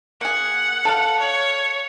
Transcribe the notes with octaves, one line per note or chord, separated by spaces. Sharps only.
A#3 G#4 F#5
A4 D5 F5
C#5